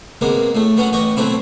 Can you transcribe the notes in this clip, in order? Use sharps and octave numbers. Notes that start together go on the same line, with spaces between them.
C3 G#3 A#3 B3
A2 A3
F#3 B3 C#4 F#5
A1 B3 G4 D#5 C#6
B2 F#3 A3 C4 E4